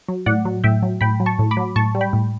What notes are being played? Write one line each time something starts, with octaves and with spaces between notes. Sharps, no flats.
F#3
A2 D5 F#5
F#3
A2 E5 G5
F#3
A2 G5 B5
F#3
A5 C#6
A2
B5 D6
F#3
A2 A5 C#6
G3
G5 B5
A2